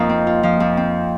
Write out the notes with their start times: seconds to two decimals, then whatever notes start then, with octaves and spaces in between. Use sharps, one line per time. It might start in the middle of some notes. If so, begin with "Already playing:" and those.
Already playing: F2 F3 A#3 D#4 A#4 C5 D#5 F5
0.09 C4
0.27 F4
0.43 F3 F5
0.60 F2
0.77 C4